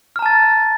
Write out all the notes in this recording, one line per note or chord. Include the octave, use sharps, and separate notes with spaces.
A5 A#5 F6 A6